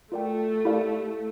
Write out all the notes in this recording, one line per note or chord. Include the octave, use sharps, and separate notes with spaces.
A3 F4 A#4 D5 G5
E4 G4 A#4 D5 F5